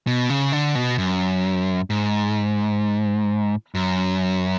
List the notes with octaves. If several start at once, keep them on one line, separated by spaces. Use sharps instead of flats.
B2
C#3
D3
B2
F#2
G#2
F#2